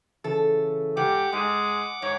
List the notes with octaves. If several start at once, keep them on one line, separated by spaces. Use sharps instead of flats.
C#3 E3 A4
G#2 G4 F#5 D6
G#2 G#3
G#2 C#5